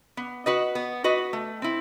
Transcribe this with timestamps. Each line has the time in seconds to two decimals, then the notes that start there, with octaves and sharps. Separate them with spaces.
0.17 B3
0.46 F#4 B4 D#5
0.75 B3
1.04 F#4 B4 D#5
1.33 A3
1.62 C4 E4